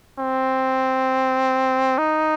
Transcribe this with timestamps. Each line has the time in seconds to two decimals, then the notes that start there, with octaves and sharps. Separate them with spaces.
0.19 C4
1.98 D#4